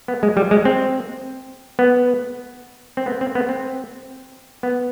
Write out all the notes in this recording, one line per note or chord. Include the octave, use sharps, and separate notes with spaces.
B3
G#3
G3
G#3
C4
B3
C4
B3
C4
B3
C4
B3